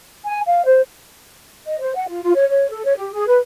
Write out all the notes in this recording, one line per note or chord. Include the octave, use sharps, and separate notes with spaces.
G#5
F5
C5
D#5
C5
F#5
F4
F4
C#5
C#5
A4
C#5
G4
G#4
B4